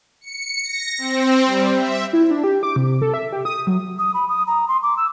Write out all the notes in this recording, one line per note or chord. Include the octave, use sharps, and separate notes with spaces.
C#7
A#6
C4
G3
E5
E4
D4
G4
D6
C3
A4
E5
G4
D#6
F#3
D#6
B5
D#6
A#5
C6
D6
E6